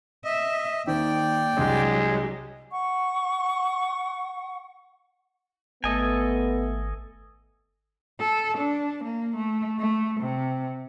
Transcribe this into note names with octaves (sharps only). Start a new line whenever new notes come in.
D#5 E5
D#2 D#3 C5 D5 G5
C2 F#3 G#3 D4 G4
F#5 C#6
G#1 A3 B3 A4 D#5 G#5
A4
D4
A#3
A3
A3
C3